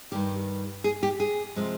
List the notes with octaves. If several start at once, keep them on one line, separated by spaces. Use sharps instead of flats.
G2 D#3 G3 G4
G#4
G4
G#4
C3 F3 G#3 C4